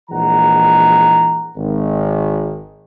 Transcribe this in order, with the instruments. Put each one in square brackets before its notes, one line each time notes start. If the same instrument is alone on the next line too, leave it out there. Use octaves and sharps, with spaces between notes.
[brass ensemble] A#1 E3 G#3 F#5 A#5
G#1 D#3